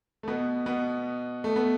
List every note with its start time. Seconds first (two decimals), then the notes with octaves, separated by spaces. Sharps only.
0.23 A3
0.28 B2 B3
0.66 B2 B3
1.44 A3
1.56 B3